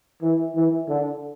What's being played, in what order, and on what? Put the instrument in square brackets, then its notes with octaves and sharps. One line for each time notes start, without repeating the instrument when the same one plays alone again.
[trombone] E3
E3
D3